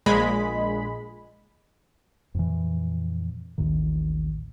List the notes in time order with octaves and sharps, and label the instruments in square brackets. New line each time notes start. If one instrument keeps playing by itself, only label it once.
[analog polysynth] A#1 A#2 G#3 B5
[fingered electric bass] F2 A#2 E3
A1 D#2 A2 D#3